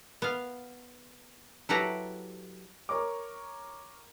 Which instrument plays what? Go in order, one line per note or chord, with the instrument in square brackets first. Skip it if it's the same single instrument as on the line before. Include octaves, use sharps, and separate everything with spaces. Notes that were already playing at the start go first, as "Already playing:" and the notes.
[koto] B3 F5
F#3 E4 G4 A4 B4 A#5
[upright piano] A#4 C#5 A#5 C#6 D6